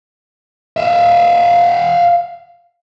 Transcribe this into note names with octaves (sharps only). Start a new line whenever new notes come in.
E5 F5